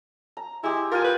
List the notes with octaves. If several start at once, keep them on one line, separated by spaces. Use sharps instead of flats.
A#5
G#3 E4 G4
F4 A#4 G5 G#5
B4